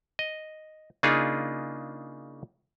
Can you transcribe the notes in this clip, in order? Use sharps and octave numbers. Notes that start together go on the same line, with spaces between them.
D#5
C#3 A#3 D4 D#4 F4 G#4